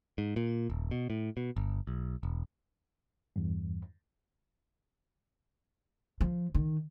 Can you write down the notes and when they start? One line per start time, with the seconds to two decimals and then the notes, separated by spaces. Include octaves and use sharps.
0.18 G#2
0.36 A#2
0.70 D#1
0.91 B2
1.10 A2
1.37 B2
1.56 G1
1.87 B1
2.23 E1
3.36 E2 G2
6.21 F3
6.55 D#3